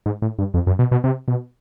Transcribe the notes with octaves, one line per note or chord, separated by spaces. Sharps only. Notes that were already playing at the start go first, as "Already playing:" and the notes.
G#2
A2
G2
F2
F#2
B2
B2
C3
B2